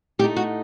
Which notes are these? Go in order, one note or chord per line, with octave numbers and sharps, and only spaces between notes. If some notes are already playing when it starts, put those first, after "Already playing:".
A2 A3 D#4 G4
F#4